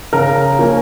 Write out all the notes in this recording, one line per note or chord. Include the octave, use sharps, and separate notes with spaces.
C#3 A#4 A#5
F3 A#3 C#4